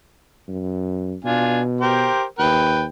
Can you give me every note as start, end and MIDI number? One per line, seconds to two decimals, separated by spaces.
0.48 1.15 42
1.24 2.12 47
1.24 1.61 62
1.24 1.61 65
1.24 1.61 80
1.81 2.24 67
1.81 2.24 70
1.81 2.24 72
2.39 2.88 39
2.39 2.84 71
2.39 2.84 79